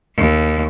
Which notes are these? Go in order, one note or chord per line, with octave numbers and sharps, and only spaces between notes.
D#2